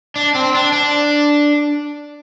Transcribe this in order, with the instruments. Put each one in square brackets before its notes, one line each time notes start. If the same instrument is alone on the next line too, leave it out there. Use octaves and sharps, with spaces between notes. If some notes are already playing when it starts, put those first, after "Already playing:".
[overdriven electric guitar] D4
C4
D4
D4